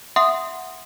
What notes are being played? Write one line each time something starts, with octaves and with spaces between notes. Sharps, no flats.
E5 F#5 C6 D#6